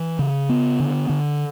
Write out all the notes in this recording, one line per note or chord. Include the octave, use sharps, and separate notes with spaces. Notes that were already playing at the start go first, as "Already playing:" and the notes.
Already playing: E3
C#3
B3
D3
D3